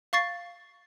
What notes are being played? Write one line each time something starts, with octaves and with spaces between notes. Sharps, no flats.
F5 C#6 A6 C7